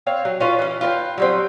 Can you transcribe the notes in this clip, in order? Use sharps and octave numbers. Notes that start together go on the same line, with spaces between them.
C4 C#5 F5
F#3
C#4 F4 B4
E3 C#4
F4 B4 D#5 G5
F#3 G3 C4